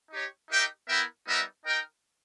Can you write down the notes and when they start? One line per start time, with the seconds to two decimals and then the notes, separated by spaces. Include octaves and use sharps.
0.11 D#4 G4 C#5
0.50 D#4 G4 A#4 E5 G5
0.88 B3 E4 A#4 E5 G5
1.26 G3 B3 D#4 A#4 E5
1.65 D#4 A#4 D#5 G5